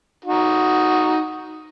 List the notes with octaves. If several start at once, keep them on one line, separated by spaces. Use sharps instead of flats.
D#4 F#4